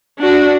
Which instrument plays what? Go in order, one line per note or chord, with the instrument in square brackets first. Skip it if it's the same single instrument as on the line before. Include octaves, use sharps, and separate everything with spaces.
[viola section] D4 F#4